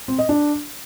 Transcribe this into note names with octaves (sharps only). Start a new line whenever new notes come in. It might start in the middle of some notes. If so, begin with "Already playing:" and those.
C4
D#5
D4